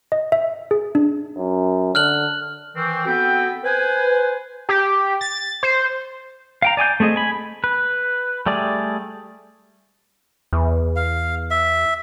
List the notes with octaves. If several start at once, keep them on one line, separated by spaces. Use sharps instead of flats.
D#5
E5
G#4
D4
F#2
D3 F6 F#6 F#7
D#3 E3 C4
B3 C4 F#4 A4 B4 G5
B4 C5 G#5
G4
A6
C5
F5 G5 A#5
D5 G#5 D6 G6
A3 C4 G#4 D#5
G#5 B5
B4
G3 A3 G#4 D5
E2
F5
E5